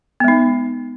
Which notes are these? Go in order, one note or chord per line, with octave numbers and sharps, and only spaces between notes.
G#3 B3 D#4